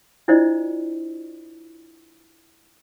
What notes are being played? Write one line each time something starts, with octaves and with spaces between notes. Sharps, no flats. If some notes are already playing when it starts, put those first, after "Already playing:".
D4 E4 F4 C5 D5 D#5